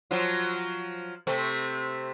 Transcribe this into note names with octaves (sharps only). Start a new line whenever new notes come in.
F3 F#3 F4
C3 A3 C4